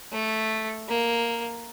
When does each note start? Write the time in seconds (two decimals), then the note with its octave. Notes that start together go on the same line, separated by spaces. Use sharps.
0.12 A3
0.89 A#3